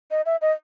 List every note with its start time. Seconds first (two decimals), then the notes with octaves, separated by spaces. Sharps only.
0.11 D#5
0.26 E5
0.42 D#5